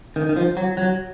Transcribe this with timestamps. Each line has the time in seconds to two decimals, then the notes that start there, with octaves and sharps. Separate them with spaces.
0.16 D#3
0.29 D#3
0.36 F3
0.57 F#3
0.77 F#3